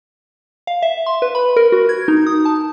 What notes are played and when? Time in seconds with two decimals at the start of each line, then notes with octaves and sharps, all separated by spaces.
0.67 F5
0.82 E5
1.06 C6
1.22 B4
1.35 B5
1.57 A#4
1.72 F#4
1.89 G#6
2.08 D#4
2.26 D#6
2.45 A5